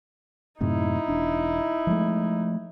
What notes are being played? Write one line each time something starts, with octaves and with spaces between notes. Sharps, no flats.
F#2 A2 C3 D#4 E4
E1 D4
F3 G#3 A3